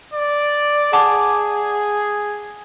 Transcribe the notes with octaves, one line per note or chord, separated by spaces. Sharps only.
D5
G#4 F#5 A5 D6